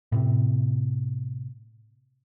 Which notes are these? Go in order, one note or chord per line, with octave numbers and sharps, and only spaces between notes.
A2 C3